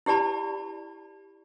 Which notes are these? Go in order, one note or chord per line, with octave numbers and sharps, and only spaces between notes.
E4 G4 D5 A5 B5